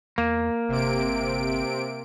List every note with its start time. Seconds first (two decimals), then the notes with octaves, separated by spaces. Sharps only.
0.18 E2 A#3
0.69 G1 C3 D7